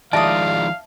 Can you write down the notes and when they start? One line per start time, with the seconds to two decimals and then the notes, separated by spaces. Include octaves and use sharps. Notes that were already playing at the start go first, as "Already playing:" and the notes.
0.13 D#3 F3 G#3 D5 E5 F5 A5 D#6